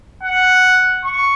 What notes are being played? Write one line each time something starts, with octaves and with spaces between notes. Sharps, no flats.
F#5
C#6